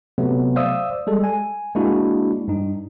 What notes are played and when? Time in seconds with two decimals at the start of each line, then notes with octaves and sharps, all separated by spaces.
0.18 C3 F#3 A3 B3
0.56 C5 D5 E5 F5 D#6 E6
1.07 G3 G#3 A4
1.24 G#5
1.75 G#3 A#3 D4 E4 F#4
2.48 G2 D#4